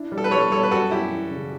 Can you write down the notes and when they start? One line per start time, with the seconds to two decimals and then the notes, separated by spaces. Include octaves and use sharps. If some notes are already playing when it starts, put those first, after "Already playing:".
Already playing: D4 E4
0.12 G3
0.18 A4
0.24 B4
0.31 G3 A4 C#5
0.52 G3 A4 C#5
0.63 B4
0.71 F#2 F#4 A4
0.91 F#2 E4 G4
1.12 E3
1.31 C#3